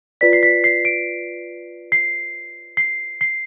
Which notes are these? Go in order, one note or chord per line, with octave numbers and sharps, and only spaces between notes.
F4 B4 D5 B6
C7
B6
C7
D7
C7
C7
C7